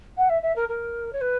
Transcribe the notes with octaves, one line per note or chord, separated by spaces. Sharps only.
F#5
E5
E5
A#4
A#4
C#5
B4